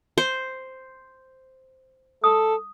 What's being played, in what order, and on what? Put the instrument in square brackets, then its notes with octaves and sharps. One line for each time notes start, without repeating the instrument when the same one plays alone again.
[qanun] C5
[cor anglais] A4 [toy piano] D#6